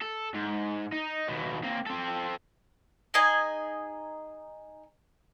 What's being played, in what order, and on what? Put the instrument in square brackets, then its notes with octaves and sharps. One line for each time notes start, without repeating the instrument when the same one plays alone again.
[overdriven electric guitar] A4
G#2
D#4
D#2 B2
A#3 C4
C4 A4
[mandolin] D#4 G#4 D#5 G#5